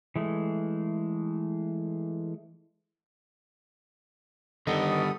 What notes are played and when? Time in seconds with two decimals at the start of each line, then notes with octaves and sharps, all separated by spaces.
0.16 E3 G#3 A3
4.67 D3 D#3 G3 B3 D#4 A4 D#5 D#6